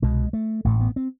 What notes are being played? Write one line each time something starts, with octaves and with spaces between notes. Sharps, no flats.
C2 B2 G#3
A3
A1 A2 A3
B3
C4